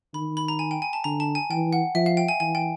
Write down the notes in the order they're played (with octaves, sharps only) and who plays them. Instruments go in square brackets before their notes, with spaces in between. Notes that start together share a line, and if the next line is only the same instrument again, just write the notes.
[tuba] D#3 [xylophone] B5
[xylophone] B5
A#5
G#5
G5
G#5
A5
[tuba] D3 [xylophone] A#5
[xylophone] A5
G#5
[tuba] E3 [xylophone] G5
[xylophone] F#5
[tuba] F3 [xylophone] E5
[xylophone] F5
G5
G#5
[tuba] E3 [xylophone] G#5
[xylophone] G5